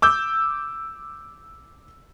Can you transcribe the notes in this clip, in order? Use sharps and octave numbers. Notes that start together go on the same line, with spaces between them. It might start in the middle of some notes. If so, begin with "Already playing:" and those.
D6 E6 G6